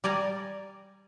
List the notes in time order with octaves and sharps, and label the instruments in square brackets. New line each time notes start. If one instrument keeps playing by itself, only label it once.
[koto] G3 D5 G#5 A#5